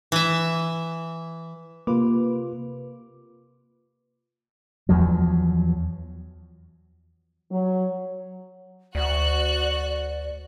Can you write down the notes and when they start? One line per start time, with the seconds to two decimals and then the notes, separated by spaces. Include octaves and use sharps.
0.12 E3 E5
1.87 C3 A#3 F4 B4 D6
4.89 E2 F3 F#3
7.51 F#3
8.95 D2 F#4 D5 F#6